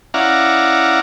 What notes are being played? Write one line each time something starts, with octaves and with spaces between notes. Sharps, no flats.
C#4 E4 D5 F5 F#5 A#5